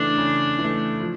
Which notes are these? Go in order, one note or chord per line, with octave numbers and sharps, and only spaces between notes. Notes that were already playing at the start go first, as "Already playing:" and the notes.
Already playing: C#3 E3 A3 D4
C#3
E3
A3
F3